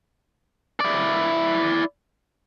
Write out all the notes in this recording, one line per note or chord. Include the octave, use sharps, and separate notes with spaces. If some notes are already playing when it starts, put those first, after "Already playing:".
E4 D5